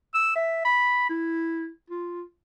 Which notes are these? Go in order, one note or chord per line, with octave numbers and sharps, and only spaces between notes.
E6
E5
B5
E4
F4